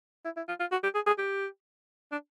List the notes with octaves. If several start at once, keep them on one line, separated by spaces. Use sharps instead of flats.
E4
E4
F4
F4
F#4
G4
G#4
G#4
G4
D4